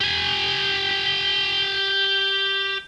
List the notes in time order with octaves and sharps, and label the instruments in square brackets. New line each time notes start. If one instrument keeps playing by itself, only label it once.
[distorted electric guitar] G4 G#5